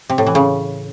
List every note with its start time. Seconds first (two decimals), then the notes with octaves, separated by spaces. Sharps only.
0.10 C3
0.18 A2
0.27 E3
0.35 C#3